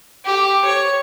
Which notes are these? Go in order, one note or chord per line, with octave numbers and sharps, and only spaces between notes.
G4
C#5